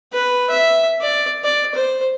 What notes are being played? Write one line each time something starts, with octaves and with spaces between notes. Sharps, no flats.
B4
E5
D5
D5
C5